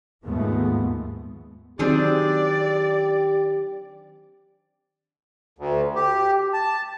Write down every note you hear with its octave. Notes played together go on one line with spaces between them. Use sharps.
D#2 G#2 F3 G#3 A3 B3
D#3 F#3 C4 D4 G4 G#4 D5
D2
G4
A5